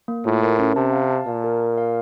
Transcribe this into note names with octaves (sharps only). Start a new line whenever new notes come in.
A#3
A2 F4
A#4
C#4
C3 A5
F5
A5
A#2 A5
A#4
A#4
F5